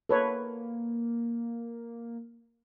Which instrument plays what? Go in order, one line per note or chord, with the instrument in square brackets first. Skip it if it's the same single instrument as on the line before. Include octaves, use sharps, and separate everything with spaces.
[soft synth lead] A#3 [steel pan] A4 B4 C#5